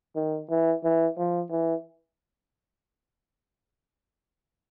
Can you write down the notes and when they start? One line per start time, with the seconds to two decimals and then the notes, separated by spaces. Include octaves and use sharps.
0.15 D#3
0.50 E3
0.84 E3
1.17 F3
1.51 E3